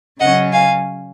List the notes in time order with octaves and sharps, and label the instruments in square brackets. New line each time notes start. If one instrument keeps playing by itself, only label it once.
[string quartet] C#3 F#3 C#4 D#5 F#5
F5 G#5